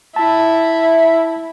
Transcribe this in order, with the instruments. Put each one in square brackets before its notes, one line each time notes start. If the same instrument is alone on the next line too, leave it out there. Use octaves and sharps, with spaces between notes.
[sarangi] E4 [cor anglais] E5 [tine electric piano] A5